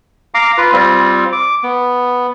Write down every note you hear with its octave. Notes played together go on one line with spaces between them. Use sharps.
F5 A#5 D6
F4 B4
G3 C4 F4
D6
B3